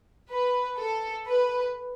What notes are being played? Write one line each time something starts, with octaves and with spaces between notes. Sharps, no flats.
B4
A4
B4